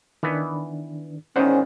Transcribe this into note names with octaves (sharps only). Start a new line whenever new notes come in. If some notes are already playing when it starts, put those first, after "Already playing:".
D#3 E3 B3 D4
E2 G#2 D#3 C#4 C5 D5 F#5